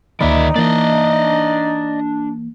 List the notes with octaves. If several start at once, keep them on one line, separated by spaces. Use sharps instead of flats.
D2 D#3 A#3 D#4 C5 D5 E5 B5
E3 A#3 D4 D5 D#5